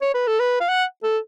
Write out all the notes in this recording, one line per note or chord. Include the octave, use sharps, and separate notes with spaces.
C#5
B4
A4
B4
F5
F#5
A4